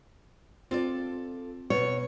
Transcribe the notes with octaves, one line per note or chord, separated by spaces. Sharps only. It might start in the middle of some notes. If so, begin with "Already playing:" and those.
C4 F4 A4 D5
B2 C#5